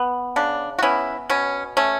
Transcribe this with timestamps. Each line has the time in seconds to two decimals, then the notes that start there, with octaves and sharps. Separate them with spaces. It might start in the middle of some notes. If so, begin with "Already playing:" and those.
Already playing: B3
0.36 C#3 D4
0.79 F#4
0.82 B3 C#4 E4
1.29 B2 C#4
1.77 A3 C#4